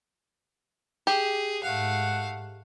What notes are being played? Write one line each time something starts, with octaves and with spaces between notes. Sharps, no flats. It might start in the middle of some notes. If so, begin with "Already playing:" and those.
G4 G#4
G#2 A3 F5 F#5